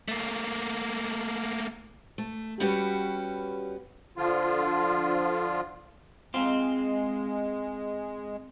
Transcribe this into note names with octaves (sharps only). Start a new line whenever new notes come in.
A3 A#3
A3
G3 B3 C#4 F#4 G4 B4
D3 F3 F4
G#3 C4 F4